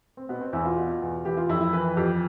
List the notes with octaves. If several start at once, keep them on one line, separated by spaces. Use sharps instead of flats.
C4
B2 B3
C4
E2 E4
F4
B2
E2
E3 G4
F4
F2 E4
E4
E3 B4
F2 G4